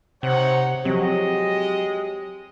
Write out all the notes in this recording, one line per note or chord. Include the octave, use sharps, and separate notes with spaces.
C3 D#4 C5 C#5 F#5
F3 F#3 G#3 C4 G4 D#5